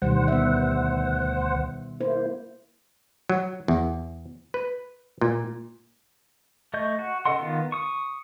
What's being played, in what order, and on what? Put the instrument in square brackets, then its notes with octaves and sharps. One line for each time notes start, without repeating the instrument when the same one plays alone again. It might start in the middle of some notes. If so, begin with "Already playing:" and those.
[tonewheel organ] D2 C5 F#5 [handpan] B2 D#3 G3
[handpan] B3 E5
[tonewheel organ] A#3 E4 [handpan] C5
[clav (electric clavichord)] F#3
E2
B4
A#2
[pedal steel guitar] A3 D#5 C#6 G6
F#4
C#3 A4 D#5 F#5 C6
D#3 B3 F4
C#6 D#6